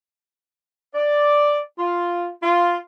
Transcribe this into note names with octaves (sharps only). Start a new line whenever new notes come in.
D5
F4
F4